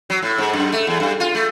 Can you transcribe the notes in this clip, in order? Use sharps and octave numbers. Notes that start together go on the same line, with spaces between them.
F#3
A2
G#2
F#2
A3
E2
G2
F4
A3